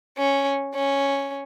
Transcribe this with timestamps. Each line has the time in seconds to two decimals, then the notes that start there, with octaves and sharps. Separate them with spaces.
0.18 C#4
0.75 C#4